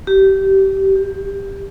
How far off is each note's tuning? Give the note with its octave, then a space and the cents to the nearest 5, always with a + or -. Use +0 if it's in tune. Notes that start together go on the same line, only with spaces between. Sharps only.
G4 -20
G4 +15